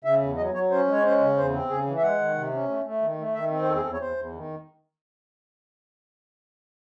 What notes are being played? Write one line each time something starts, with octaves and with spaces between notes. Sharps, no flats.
C#3 E5
E2
F#3 D#5
F#3 C#5
C#4 C5
G#3 C#5
C#4 C5
C#3
E2 C5
C4
C#3 G#4
E3
E5
G#3 F#5
D#3
C3
C#4
A3
A3
D#3
A3
D#3 E5
C4
C5
E2 A4
G#4
E2 A4
C#5
E2 C5
E2
D#3